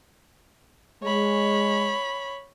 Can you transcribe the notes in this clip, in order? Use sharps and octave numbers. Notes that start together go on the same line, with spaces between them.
G#3 C#5 B5